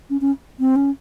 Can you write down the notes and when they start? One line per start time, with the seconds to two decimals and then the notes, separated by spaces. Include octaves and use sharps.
0.10 C#4
0.21 C#4
0.60 C4
0.76 C#4